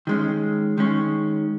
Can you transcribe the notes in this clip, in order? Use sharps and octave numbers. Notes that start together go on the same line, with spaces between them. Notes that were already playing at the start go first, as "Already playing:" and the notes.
D#3 G#3 C#4
D#3 G#3 C#4